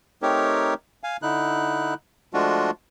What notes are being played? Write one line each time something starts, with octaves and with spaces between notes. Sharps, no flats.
A3 C4 D#4 G4 A#4 C#5
F5 G#5
D3 D#4 E4 F#6
F3 G#3 A3 D4 F4 F#4